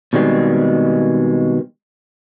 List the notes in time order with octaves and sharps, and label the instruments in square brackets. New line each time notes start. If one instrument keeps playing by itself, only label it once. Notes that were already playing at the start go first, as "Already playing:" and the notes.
[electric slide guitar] B2 D#3 G3 G#3 C4